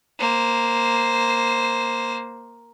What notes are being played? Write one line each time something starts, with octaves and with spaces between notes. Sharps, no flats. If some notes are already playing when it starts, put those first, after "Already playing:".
A#3 C5